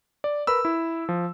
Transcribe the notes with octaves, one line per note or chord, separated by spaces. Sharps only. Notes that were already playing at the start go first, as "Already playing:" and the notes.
D5
A#4 B4 B5 E6
E4
F3